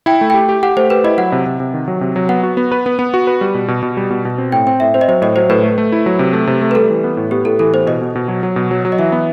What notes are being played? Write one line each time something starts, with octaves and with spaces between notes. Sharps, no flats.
E4 G5
A3
G4 G5
G4
G4 F#5
A3 C5
G4 B4
E4 D#5
F#3 F#5
C3
C3
C3
D#3
F#3
C3
F#3
B3 F#5
F#4
B3
B4
B3
B3
F#4
B4
G3
B2
B2
B2
G3
B2
B2
C4
A2 G5
C4 G5
A2 E5
C4 C5
D#5
F#3 C5
A2 D#5
F#3 C5
A2 B4
A3
A3
E4
F#3
C3
A3
C3
A3
B4
G3 A4
E3
B3
A2
B3 G4
A2 A4
E3 A4
B3 C5
B2 D#5
B2
B2
F#3
F#3
B2
F#3
F#3
D#5
E3 E5
B3